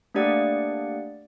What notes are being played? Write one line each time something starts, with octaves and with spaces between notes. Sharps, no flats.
A3 A#3 D4 G4 D5 F#5